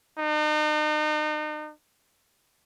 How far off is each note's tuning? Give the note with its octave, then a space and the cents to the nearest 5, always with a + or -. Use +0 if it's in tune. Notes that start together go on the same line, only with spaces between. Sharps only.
D#4 -40